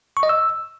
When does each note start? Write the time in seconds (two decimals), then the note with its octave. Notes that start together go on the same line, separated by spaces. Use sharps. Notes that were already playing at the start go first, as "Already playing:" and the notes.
0.17 C#6
0.23 D#5
0.29 E6